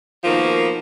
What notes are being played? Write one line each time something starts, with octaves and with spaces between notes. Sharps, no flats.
B2 D#3 F3 A#3